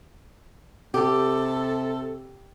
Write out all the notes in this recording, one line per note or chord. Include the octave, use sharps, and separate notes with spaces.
C3 G4 A4